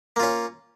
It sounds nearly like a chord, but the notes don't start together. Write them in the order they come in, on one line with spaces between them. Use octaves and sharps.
A#3 F4 C#4